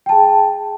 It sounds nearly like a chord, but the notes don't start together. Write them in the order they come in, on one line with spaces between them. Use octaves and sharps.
G5 A5 G#4